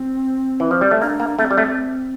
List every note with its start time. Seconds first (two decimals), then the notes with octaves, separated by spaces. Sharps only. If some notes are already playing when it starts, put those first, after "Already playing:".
Already playing: C4
0.60 E3
0.71 F3
0.81 G3
0.91 A3
1.01 A#3 D4
1.20 A#3
1.39 A3 C4
1.51 G3
1.58 A3